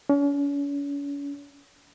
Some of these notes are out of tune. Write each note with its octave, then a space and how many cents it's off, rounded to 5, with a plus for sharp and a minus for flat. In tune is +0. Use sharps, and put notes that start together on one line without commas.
C#4 +40